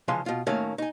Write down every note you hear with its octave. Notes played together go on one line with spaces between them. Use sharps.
C#3 E3 F3 G#3 F5 C6
B2 F4
A2 D#3 F#3 A3 A#3 C#4
D#4 G#5